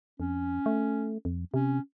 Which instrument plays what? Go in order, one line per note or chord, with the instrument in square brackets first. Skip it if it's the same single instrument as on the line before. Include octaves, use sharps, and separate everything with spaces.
[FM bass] F2 [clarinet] C#4
[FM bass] A3
F2
[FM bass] C3 [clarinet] C#4